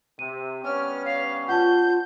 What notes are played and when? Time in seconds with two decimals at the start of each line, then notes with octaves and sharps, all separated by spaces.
0.19 C3 D#7
0.65 G2 B3 C#4 C#5 F6
1.05 F5
1.49 F4 F#5 A5 G6